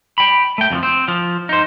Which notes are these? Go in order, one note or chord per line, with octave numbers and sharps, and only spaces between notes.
G5 B5
A3 G5
F2 E3 F3
C4
F3
D#4 C5